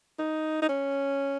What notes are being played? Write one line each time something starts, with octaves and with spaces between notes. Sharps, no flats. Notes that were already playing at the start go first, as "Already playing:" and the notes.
D#4
D#4
C#4